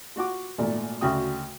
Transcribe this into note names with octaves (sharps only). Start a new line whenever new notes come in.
F4 F#4 F#5 D6
G#1 A#2 A3 D5
D2 C#3 F#4 G5 D#6